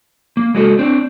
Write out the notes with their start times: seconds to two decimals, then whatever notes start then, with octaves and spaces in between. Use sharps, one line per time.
0.37 A#3
0.55 G#3 F#4 A4
0.79 C4 D4